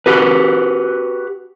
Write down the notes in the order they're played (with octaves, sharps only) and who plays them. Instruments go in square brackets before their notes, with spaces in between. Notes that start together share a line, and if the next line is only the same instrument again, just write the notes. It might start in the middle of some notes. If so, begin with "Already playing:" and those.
[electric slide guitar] F#4 G4 B4